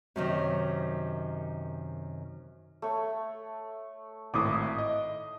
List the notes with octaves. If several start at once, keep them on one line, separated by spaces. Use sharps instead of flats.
F#2 C3 D#3
A3 C#5
G#1 A2 D6 D#6
D#5